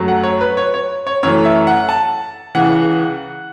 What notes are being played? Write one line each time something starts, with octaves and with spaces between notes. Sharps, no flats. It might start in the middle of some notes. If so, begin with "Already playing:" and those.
Already playing: F#2 F#3 A3
F#5
C#5
B4
C#5
C#5
C#5
F#2 E3 A3 C#5
E5
F#5
A5
C#2 C#3 E3 F#5